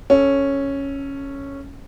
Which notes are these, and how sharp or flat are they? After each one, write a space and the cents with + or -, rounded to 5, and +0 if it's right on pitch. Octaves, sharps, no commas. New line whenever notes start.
C#4 -5 A4 +0